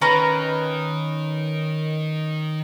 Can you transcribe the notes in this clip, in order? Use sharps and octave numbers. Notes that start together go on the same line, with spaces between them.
D#3 C#4 B4 A#5